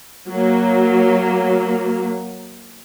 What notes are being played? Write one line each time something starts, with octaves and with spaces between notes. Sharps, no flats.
F#3 A#3